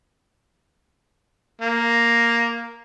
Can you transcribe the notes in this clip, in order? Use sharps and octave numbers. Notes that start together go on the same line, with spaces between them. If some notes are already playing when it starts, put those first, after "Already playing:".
A#3